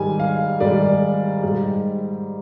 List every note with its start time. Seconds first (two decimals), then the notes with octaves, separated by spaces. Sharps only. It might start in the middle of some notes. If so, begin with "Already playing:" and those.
Already playing: G#2 D#3 G3 G#5
0.20 F5
0.60 G#2 D#3 G3 D5
1.43 G#2 G3